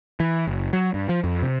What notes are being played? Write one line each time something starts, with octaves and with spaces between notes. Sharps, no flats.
E3
F#1
F#3
G2
F3
F2
C3